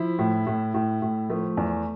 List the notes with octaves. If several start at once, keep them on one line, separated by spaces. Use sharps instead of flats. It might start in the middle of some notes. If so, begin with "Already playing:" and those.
Already playing: F3 E4
A2
A2
A2
A2
F3 A3
E2